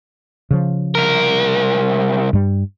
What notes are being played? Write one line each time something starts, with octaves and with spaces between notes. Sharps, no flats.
C#3 F3
C2 A#4
G2 G3